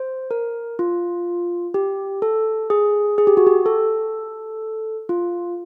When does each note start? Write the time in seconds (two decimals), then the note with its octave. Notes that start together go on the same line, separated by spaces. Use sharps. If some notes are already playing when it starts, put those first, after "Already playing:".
Already playing: C5
0.31 A#4
0.79 F4
1.74 G4
2.22 A4
2.70 G#4
3.18 G#4
3.27 G4
3.37 F#4
3.47 G4
3.66 A4
5.09 F4